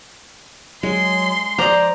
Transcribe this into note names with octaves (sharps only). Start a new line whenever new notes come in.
F#3 G#3 C6
F3 C5 D5 D#5 A#5